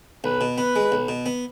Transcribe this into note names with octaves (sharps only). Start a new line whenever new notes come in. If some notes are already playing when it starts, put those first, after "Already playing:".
B1 B4
B2
B3 B4
G#3
B1
B2
B3